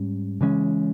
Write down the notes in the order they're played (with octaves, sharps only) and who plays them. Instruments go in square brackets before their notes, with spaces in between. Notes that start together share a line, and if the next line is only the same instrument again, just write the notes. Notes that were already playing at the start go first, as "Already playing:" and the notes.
Already playing: [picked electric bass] G#2 G3 C#4
C#3 E3 G#3 C#4